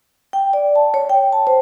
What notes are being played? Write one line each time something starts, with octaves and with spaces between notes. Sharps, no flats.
G5
D5
A5
C#5
G5
A5
C5